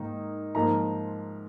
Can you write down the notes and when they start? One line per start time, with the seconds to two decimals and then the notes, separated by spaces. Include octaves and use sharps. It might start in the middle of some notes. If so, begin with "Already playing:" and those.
Already playing: G#2 D#3 A#3 D#4
0.55 G#2 F3 A#3 A#5